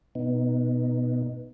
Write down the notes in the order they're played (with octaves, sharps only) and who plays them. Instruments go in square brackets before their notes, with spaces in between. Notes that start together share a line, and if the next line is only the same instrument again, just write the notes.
[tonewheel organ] B2 B3 D#4